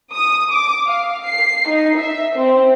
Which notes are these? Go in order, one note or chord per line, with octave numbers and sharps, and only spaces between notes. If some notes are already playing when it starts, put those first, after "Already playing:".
D#6
D6
F5
C7
D#4
E5
C4